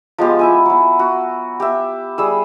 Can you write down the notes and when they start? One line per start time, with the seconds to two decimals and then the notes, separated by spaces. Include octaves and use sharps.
0.18 F3 G#3 B3 G4
0.39 E4 E5 G#5
0.66 F#3 E4
0.99 F#4
1.60 G4 E5
2.18 G3 G#4 E6